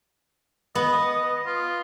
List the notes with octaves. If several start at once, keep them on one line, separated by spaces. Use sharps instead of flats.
B3 D#5
F4